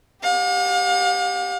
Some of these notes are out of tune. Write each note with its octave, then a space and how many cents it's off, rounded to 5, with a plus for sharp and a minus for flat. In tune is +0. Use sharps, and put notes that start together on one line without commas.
G4 +0 F5 +45